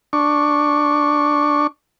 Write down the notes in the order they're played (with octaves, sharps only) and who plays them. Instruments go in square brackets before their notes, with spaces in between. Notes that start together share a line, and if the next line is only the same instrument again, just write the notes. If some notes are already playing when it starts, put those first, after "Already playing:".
[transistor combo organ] D4 C#6